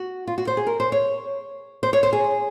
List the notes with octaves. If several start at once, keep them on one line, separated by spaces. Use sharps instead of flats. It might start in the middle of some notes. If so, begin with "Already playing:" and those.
Already playing: F#4
F4
F#4
C5
G#4
A#4
C5
C#5
C5
C#5
C5
G#4